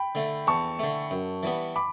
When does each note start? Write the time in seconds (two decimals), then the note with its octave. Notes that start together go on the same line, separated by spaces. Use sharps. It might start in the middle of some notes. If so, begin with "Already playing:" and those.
Already playing: G5 B5
0.15 D3 A3
0.47 E2 A5 C#6
0.79 D3 A3
1.11 F#2
1.43 E3 G3 B3
1.76 B5 D6